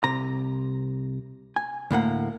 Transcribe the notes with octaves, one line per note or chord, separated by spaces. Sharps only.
C2 C3 A#5
G#5
D2 A2 A#3 F#5